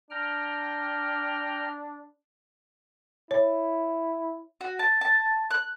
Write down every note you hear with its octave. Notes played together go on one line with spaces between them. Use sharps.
D4 G5 A#5 F6
E4 C#5
F#4
A5
A5
F#6